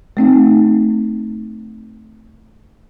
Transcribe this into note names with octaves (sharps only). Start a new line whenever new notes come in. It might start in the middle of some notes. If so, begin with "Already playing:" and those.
A3 C4 D#4